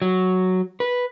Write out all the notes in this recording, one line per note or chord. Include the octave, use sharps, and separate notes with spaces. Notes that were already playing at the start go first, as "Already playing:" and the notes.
F#3
B4